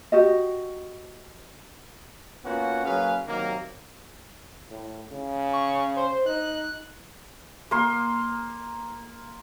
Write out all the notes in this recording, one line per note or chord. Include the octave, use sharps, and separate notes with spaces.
F#4 G4 D#5
A#3 B3 C#4 F4 F#4 F#5
F#3 A#3 C#4 G#4 B4 F5
C3 D#3 F#3 A#3
A2
C#3
C#6
C5
D#4 F#6
A#3 C6